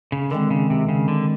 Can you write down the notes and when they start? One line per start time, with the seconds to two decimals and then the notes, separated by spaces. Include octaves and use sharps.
0.12 C#3
0.31 D3 D#3 G#3 C4
0.50 C#3
0.70 C3
0.89 C#3
1.08 D3